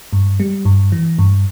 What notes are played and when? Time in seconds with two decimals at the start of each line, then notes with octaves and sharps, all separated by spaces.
0.13 G2
0.40 G3
0.65 G2
0.92 E3
1.18 G2